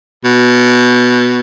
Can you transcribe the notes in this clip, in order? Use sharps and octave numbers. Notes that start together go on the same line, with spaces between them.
B2